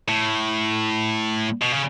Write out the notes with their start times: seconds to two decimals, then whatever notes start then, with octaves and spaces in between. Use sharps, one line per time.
0.08 A2
1.62 B2
1.73 C#3